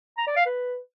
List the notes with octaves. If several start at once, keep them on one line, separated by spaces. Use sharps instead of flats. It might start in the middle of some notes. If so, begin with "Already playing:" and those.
A#5
D5
F5
B4